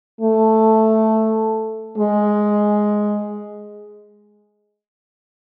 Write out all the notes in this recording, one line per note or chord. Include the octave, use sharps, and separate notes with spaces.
A3
G#3